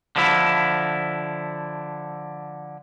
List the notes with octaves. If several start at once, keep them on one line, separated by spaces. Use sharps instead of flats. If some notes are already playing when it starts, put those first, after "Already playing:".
D3 F3 E4